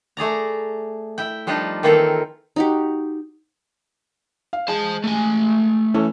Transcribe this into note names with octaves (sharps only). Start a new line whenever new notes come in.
A3 G#4 D5 A#5
E4 G5
F3 G3 D4 D#4 F4
D#3 E3 A#3 C4 F4 A4
D#4 F#4 G4
F5
G#3 C5 A5
A3 G#5
E3 C#4 A4